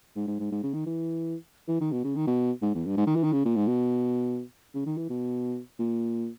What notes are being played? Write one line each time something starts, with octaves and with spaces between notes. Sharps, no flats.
G#2
G#2
G#2
G#2
C#3
D#3
E3
E3
D#3
B2
C#3
D#3
B2
G#2
E2
G2
G#2
D#3
E3
D#3
C#3
A#2
G#2
B2
C#3
D#3
E3
B2
A#2